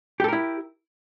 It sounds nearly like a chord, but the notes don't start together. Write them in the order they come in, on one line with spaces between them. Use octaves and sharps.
G4 A4 A#4 E4